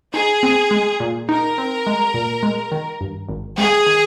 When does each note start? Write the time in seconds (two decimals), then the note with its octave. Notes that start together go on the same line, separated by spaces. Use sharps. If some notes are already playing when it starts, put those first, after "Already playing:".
0.14 D#4 G#4
0.43 C4
0.71 G#3
1.00 A#2
1.29 D#4 A#4
1.58 C4
1.87 G#3
2.14 A#2
2.43 G#3
2.72 D#3
3.01 G2
3.29 G#1
3.57 G#3 G#4
3.86 D#3